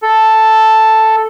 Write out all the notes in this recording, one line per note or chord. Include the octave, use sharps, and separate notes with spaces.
A4